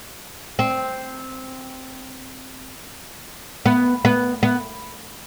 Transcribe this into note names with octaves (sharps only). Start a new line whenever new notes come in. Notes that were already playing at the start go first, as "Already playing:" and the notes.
C4
B3
B3
B3